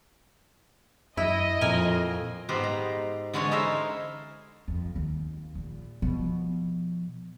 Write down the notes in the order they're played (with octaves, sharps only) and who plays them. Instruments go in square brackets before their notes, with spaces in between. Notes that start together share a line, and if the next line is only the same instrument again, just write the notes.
[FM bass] F#2 [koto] E4 [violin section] D#5
[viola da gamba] F2 [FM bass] A#2 [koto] A#4 G#5
[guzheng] G#2 B3 G4 C5 D#5 A#5
A#5
D3 E3 G#3 C#4 C#5
D#4 E4 A4 A#4 C5 E5
[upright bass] F2
D#2
A#1
B2 F3